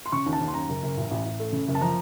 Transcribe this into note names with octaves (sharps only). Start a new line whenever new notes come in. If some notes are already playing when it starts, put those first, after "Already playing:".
C6
C#3 C#6
D#2
A5
D#2
C6
F#2 A#5
F#1
F#1
A1
A1
A1
A3
C#3
F#1
A5
F3 A#5